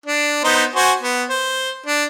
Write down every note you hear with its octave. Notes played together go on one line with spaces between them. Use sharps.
D4
B3 D#4 C5
F#4 C5 G#5
B3
C5
D4